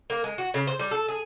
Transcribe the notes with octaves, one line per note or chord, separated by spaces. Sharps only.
A#3
G#3
F#4
C#3
C5
G3
A4
G#4